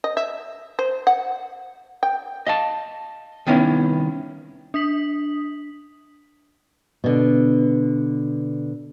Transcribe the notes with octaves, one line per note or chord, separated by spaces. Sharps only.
D#5
E5
C5
F#5
G5
D#5 F5 A5
C2 D#3 B3 C#4 E4
D4 D#6 B6 F#7
B2 D3